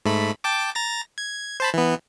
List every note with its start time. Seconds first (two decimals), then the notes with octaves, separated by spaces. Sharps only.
0.05 G#2 A3 B5
0.44 G5 A5 D6
0.75 A#5 A6 A#6
1.18 G#6
1.60 C5 A5 B5
1.74 E3 B3